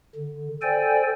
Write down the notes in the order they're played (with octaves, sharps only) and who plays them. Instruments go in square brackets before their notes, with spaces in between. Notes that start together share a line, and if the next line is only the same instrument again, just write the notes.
[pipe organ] D3
A4 C5 D5 G5 G#5